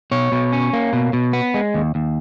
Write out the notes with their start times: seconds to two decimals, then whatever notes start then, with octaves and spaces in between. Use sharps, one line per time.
0.11 B2 C#5
0.32 B2
0.53 C#4
0.73 A#3
0.93 B2
1.13 B2
1.33 B3
1.54 G#3
1.74 D#2
1.95 D#2